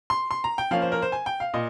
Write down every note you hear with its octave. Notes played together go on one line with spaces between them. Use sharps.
C6
C6
A#5
G5
F3 A#3 C#4 F5
C5
A#4
C5
G#5
G5
F5
A#2 D#5